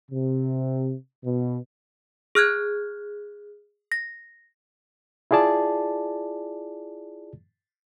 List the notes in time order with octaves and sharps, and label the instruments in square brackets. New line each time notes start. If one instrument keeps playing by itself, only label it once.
[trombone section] C3
B2
[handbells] G#4 F6 F#6 G#6
A#6
[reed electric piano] E4 F4 G#4 D5 A5